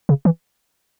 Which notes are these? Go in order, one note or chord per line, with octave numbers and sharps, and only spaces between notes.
C#3
E3